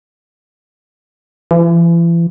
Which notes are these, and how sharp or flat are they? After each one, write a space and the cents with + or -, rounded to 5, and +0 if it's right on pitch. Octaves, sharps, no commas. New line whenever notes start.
E3 +40